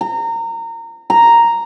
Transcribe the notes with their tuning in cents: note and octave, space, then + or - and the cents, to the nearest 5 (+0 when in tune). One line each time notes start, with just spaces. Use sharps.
A#5 -25
A#5 +0